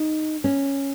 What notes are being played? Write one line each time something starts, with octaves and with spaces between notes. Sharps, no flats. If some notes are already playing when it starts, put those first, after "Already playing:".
Already playing: D#4
C#4